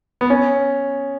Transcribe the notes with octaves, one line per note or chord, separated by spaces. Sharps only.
B3
C#4